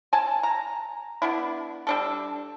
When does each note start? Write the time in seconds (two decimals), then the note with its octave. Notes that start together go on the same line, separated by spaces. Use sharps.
0.13 G#5 A5
0.43 A#5
1.22 B3 D4 E4
1.87 G3 D4 A4